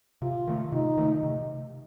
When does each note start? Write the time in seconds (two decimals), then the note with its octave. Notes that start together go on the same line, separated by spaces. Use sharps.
0.22 C3 F4
0.47 D#3 A3
0.72 C3 D#4
0.97 D#3 A3
1.23 C3